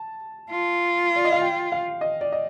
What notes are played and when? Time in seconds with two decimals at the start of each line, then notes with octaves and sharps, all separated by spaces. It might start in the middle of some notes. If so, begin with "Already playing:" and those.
Already playing: A5
0.51 F4
1.16 D5
1.25 D#5
1.32 F5
1.42 G5
1.72 F5
2.01 D#5
2.21 D5
2.32 D#5